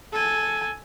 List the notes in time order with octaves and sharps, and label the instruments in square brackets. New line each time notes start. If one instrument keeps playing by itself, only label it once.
[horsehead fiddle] A4 G#5